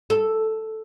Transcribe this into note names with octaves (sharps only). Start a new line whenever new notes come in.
A4